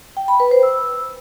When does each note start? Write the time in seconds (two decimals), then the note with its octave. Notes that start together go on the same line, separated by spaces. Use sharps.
0.17 G5
0.28 B5
0.40 B4
0.51 C5
0.63 E6